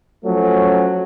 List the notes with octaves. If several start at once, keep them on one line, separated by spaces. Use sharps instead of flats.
F3 F#3 A3 C#4